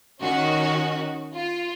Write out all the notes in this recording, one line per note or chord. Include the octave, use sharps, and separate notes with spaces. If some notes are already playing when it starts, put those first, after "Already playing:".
D#3 C#4 F#4
F4